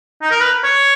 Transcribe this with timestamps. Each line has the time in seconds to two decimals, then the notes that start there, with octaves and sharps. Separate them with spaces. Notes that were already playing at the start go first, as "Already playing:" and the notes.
0.22 D#4
0.31 A#4
0.40 B4
0.64 C#5